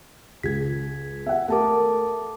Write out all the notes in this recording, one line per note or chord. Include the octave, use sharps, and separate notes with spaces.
C#2 G#6 B6
E5 F#5
A3 A4 A#4 A5 D6